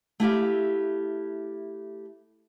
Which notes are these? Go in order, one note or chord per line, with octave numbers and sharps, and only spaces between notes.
A3 E4 G4 F5